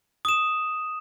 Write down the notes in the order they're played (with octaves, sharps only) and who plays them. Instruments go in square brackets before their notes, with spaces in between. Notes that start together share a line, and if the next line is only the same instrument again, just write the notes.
[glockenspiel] D#6 E7